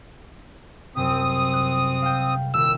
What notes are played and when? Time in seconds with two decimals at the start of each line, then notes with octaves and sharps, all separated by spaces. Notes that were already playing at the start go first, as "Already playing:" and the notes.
0.96 C2 F#2 C3 C4 D#6
1.53 F#6
2.02 F5 G5
2.54 D#1 C2 E6